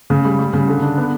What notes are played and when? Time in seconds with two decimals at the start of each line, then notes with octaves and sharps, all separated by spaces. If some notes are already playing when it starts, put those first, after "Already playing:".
0.10 C#3
0.25 G3
0.39 G3
0.53 C#3
0.68 D3
0.82 D4
0.97 B3